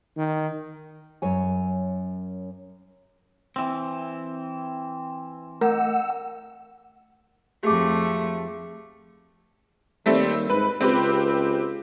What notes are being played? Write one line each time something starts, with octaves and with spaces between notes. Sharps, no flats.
D#3
F#2 C#5 G#5
E3 C4
A3 A#4 F#5 E6
F2 A3 G4 G#4 D6
D#2 G3 A3 C4
G#2 B4
C#2 C4 G4 B4